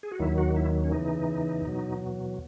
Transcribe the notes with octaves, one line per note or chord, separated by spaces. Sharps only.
G#4
F#4
D#2 D#3 F#3 E4
F#4
E4
C#4
E2 C#3 E3 D#4
E2 B2 F#3